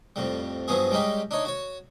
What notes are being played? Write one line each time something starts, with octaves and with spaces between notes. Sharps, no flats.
F2 A2 G3
G2 F3 F#3 B3 G#4
G3 G#3 C#4 D#4 G4
D4 D#4 C#5
F#4 C#5